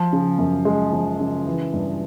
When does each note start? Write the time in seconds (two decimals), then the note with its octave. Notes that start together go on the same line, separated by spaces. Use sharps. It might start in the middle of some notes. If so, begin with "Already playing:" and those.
Already playing: F3
0.13 C#3
0.38 F#2
0.65 G#3
0.92 F3
1.20 C#3
1.46 E3
1.73 G2